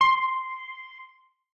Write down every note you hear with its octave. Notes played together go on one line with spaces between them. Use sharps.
C6